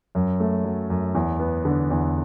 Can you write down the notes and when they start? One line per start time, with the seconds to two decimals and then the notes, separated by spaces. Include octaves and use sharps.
0.15 F#2
0.40 A3
0.64 F#3
0.90 F#2
1.15 E2
1.39 B3
1.65 D3
1.90 E2